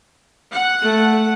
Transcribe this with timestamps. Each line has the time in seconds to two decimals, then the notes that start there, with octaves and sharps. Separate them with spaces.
0.53 F#5
0.82 A3